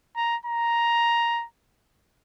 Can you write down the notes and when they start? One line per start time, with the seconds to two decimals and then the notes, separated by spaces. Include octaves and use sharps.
0.16 A#5
0.45 A#5